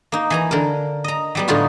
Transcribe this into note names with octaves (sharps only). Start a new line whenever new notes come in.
A#3 D#4
E3 G#5 A#5
D3 A#4
D#5 A#5
F#3 G3 B3
A2 D3 D#4 F4 F#4